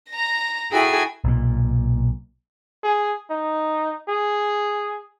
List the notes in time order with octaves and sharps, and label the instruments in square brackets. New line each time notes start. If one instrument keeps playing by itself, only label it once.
[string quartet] A#5 A#6
E4 F#4 G#4 A4 G5 G#5
[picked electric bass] B1 A#2
[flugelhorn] G#4
D#4
G#4